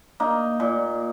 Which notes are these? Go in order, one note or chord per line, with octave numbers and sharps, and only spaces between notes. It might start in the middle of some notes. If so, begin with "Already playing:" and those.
A#3 D#4
A#2